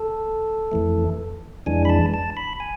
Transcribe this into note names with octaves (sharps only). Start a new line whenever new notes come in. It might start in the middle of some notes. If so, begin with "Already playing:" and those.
Already playing: A4
F2 E3 A3
F2 E3 G#3 D4 G#5
B5
A5
A5
B5
G#5